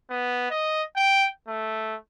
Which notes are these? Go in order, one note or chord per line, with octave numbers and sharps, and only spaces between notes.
B3
D#5
G5
A3